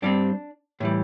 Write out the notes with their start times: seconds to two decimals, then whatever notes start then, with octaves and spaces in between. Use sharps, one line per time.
0.02 G2 G3 C4 D4
0.80 A2 E3 G3